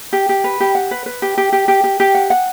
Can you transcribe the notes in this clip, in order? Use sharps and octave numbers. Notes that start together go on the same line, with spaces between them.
G4
G4
B4
G4
F#5
B4
B4
G4
G4
G4
G4
G4
G4
F#5
F#5